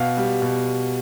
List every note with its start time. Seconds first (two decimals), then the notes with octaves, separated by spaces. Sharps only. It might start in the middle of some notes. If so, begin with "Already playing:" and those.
Already playing: B2 F5
0.17 G3
0.42 B2